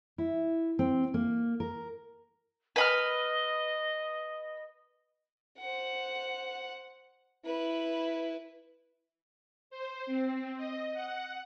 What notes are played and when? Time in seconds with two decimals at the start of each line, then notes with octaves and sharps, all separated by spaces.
0.18 E4
0.79 C4
1.14 A#3
1.60 A#4
2.76 B4 D#5 B5 F6
5.59 C5 F#5
7.45 E4 B4
9.70 C5
10.06 C4
10.57 D#5
10.93 F#5